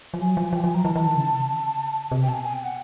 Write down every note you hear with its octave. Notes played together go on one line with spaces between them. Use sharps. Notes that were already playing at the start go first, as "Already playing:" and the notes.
F3
F#3 G#5
F3
F3 G5
F3 G#5
F#3 A#5
E3 A5
E3
D#3
C#3
C3
C#3
C3
G5
B2 G#5 A5
G#5
G5
F#5